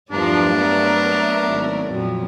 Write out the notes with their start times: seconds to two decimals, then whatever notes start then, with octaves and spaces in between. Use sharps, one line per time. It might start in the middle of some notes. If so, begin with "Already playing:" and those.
0.12 E2 G2 F3 F#3 A3 D4 A#4 D5
0.55 B3 A#4 E5
1.49 G#1
1.92 F2 A#2 F3 F#3